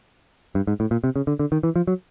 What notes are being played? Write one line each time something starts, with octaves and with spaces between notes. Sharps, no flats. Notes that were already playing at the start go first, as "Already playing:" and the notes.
G2
G#2
A2
A#2
C3
C#3
D3
D3
D#3
E3
F3
F#3